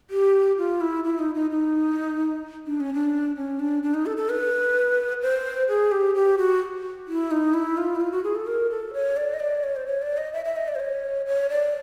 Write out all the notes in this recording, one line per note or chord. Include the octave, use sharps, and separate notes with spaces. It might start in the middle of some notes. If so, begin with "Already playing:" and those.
G4
F4
E4
E4
D#4
D#4
D#4
D4
C#4
D4
C#4
D4
D4
D#4
A4
A4
B4
C5
G#4
G4
G4
F#4
E4
D#4
E4
F4
E4
F4
F#4
G#4
A4
A#4
A4
C#5
D5
D#5
D5
C#5
C5
C#5
D5
D#5
E5
E5
D#5
D5
C5
C#5
C#5
D5